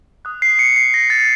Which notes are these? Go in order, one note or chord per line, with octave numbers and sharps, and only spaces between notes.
D#6 F#6
C7
C#7
C7
A#6
A6